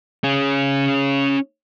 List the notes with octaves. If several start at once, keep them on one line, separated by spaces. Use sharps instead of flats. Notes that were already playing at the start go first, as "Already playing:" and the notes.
C#4 G#4